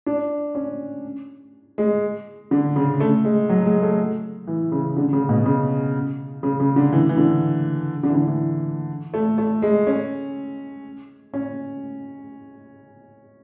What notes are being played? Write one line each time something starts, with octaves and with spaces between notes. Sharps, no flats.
D4
C#4
G#3
D3
C#3
A3
G#3
F#3
G#3
A3
E3
C#3
D3
C#3
B2
C#3
C#3
C#3
D3
E3
E3
D3
D3
E3
D3
E3
A3
A3
G#3
C#4
C#4